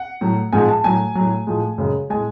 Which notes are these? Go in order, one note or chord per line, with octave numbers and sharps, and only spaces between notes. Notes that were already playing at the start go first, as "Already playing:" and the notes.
Already playing: F#5
A2 F#3
G#2 F3 G#3 G#5
A5
A2 F#3 G#5
A2 F#3
A2 F3 G#3
F#2 C#3 G#3
A2 G#3 G#5